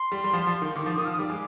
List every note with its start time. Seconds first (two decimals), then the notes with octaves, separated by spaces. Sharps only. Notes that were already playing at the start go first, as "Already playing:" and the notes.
Already playing: C6
0.12 G3
0.24 G3
0.33 F3
0.47 F3
0.62 D#3
0.76 D#3 D6
0.86 F3
0.97 D#3 D#6
1.05 F6
1.08 F3
1.12 D#6
1.19 G3 D6
1.30 G#3